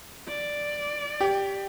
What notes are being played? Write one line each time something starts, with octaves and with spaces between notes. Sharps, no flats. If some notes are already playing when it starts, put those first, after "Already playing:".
D5
G4